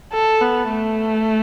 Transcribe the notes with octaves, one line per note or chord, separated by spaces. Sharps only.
A4
B3
A3